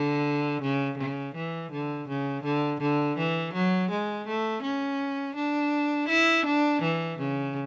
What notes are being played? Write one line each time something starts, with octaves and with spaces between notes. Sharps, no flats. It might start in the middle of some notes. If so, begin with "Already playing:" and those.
Already playing: D3
C#3
C#3
E3
D3
C#3
D3
D3
E3
F#3
G#3
A3
C#4
D4
E4
D4
E3
C#3